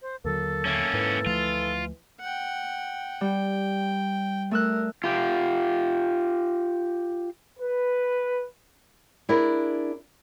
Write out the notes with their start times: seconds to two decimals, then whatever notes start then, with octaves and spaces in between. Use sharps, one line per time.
0.02 C5
0.24 D#2 D3 F#3 A#3 A4
0.65 A3 A#3 C#4
0.93 G#2 E3
1.26 D2 F3 A3 F4
2.20 F#5 G5
3.21 G3 G5
4.51 A3 A#4 E6 F#6
5.04 F4 G4
7.59 B4
9.29 D4 E4 G#4 A#4